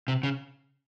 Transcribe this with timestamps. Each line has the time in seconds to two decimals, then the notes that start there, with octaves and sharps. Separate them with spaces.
0.08 C3
0.23 C#3